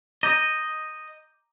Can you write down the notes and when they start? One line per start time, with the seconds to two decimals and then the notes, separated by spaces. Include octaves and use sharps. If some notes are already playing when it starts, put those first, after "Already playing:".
0.23 D#5 A#5 D6 G6